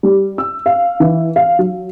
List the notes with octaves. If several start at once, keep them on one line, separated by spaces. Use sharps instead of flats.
G3
E6
F5
E3
F5
F#3